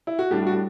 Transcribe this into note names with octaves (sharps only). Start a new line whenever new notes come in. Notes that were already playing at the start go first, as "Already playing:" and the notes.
E4
F#4
A2 G3 D4 G4
F#4